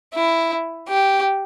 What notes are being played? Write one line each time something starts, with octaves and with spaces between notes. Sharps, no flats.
E4
G4